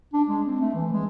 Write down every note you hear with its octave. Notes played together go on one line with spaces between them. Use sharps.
D4
G#3
C4
A3
E3
G#3